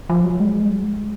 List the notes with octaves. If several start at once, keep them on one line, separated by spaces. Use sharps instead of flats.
F3
F#3
G#3
G3
G#3